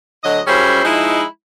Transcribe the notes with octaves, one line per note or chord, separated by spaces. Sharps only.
D2 D3 F#3 D#5
F#2 G3 C#4 E4 G#4 C5
F3 G#3 D#4 E4